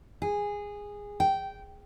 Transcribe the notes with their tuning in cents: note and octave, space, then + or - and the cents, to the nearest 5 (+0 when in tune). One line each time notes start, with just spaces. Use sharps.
G#4 -15
G5 -15